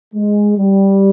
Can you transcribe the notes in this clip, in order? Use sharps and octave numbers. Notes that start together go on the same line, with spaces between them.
G#3
G3